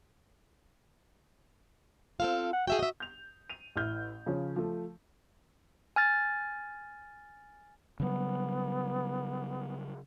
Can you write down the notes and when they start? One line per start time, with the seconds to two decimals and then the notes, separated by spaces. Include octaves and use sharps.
2.20 C4 F4 A4 F5
2.53 F#5
2.67 F#4 G#4 E5 G5
2.79 D#5 E5
3.00 G6 F7
3.50 D#7 F7
3.76 A1 E4 F6 G6
4.26 C#3 F3 C#4
4.56 F3 A3
5.96 G#5 F6 A6
8.00 C#3 F#3 G3 B3